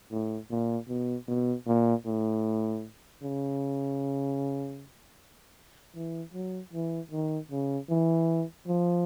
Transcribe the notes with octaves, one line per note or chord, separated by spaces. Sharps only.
A2
A#2
B2
B2
A#2
A2
C#3
E3
F#3
E3
D#3
C#3
E3
F3